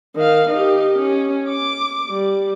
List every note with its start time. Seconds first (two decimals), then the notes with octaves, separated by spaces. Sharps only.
0.15 D#3 F5
0.49 D#4 G4
0.98 C#4
1.49 D6
2.09 G3